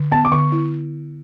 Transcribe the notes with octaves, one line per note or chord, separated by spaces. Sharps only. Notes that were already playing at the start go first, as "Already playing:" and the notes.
Already playing: D3
B3 A5
D6
D3 C#6
E4